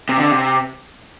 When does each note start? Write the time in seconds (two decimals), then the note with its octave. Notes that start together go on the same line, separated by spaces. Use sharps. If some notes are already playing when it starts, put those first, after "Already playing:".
0.09 C3
0.19 D3
0.31 C3